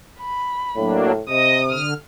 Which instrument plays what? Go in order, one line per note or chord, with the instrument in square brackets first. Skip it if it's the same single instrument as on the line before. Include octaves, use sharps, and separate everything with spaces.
[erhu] B5
[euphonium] A2 [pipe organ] F#3 A#3 D4
[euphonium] C3 [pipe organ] D#5 [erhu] D#6
[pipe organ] D3 F6